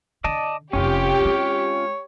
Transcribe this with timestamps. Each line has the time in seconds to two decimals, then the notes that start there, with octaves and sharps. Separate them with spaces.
0.24 D3 D5 D#5 A5
0.73 F1 C4 C#4 F4 G4 C#5
1.21 G#3 C4